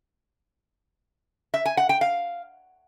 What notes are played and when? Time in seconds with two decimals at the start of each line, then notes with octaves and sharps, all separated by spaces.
1.54 E5
1.66 G#5
1.77 F#5
1.89 G5
2.01 F5